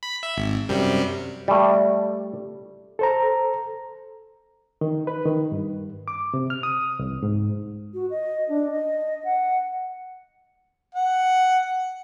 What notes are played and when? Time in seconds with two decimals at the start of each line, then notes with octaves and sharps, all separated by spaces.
0.03 B5
0.23 E5
0.37 G#1
0.69 F#2 C3 G3
1.48 G3 A3
2.99 A4 C5 A#5
4.81 D#3
5.07 B4
5.26 D#3
5.52 G2
6.08 D6
6.34 C3
6.50 F6
6.63 D#6
6.99 C2
7.23 G#2
7.94 F#4
8.11 D#5
8.49 D4
8.71 D#5
9.24 F#5
10.95 F#5